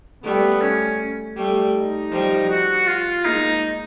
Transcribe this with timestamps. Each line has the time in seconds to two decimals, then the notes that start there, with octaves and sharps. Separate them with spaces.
0.23 G3 A3 B3
0.61 C#4
1.36 G3 A3
1.75 D#4
2.12 F3 G3
2.50 F#4
2.87 F4
3.25 G#3 A#3 D#4